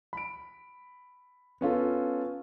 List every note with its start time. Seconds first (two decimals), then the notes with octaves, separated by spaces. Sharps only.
0.13 B5 D7
1.61 B3 C#4 F4 A4